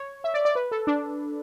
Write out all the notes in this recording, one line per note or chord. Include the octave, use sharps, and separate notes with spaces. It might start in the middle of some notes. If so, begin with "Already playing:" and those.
Already playing: C#5
E5
D5
D5
B4
A4
D4